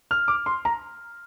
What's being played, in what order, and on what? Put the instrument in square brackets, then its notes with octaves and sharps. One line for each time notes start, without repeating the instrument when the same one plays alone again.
[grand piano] F6
D6
C6
A#5